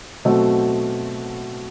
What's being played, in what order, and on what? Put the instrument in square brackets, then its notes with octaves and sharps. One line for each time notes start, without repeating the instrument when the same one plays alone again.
[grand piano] B2 F#3 A3 C4 F#4